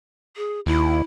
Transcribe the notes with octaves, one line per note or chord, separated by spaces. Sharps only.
G#4
D#2 E4